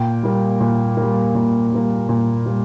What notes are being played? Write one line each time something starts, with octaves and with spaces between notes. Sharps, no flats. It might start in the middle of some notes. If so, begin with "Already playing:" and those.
Already playing: A#2 G5
G3 A#3
A#2
G3 A#3
A#2
G3 A#3
A#2
G3 A#3